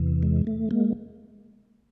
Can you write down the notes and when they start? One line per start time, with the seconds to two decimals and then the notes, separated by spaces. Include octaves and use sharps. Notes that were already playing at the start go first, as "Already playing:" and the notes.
Already playing: E2 C3 E3
0.23 G#3
0.47 A3
0.71 G#3 A#3